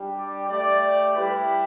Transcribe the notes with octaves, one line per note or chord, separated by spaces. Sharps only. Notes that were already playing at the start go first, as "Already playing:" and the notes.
Already playing: G3 D4 G4
D5
A3 G4 D5
G3 E4 G4 B4